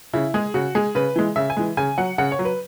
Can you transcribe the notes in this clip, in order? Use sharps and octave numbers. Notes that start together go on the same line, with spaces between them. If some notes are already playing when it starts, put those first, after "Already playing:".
C#3 E4
G#3 G#4
C#3 F#4
G#3 G#4
C#3 B4
E3 G#3
C#3 E5
G#5
E3 G#3
C#3 G#5
F#3 F#5
C#3 F#5
C#5
F#3
B4